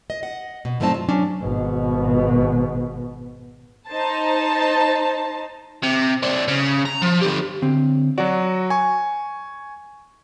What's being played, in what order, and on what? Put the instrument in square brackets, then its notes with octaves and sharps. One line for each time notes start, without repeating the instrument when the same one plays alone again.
[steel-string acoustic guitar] D#5
D#5 F#5
B2
G2 F#3 A3 C4 D#4 A5
F4
F#3 C#4 D4
[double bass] G#1 B2
[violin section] D#4 C5 A5
[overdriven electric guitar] C3
C4 D4
C#3
A#5
F3
D3 G4
[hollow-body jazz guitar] D3 C4
[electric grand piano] F#3 F#4 [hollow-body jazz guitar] D5
[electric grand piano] G#5 C#6